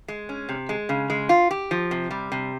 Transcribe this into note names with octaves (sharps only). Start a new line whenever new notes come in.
G#3
C#4
C3
G#3
C#3
G#3
F4
G4
F3
C3
G3
C3